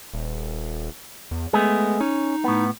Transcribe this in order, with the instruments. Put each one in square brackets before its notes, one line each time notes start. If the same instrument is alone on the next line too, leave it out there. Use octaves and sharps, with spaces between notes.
[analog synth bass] D#1
E2
[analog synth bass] G#3 [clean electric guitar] A3 B3 G#4
[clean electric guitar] C#4 [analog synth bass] D#4
[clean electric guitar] A2 B3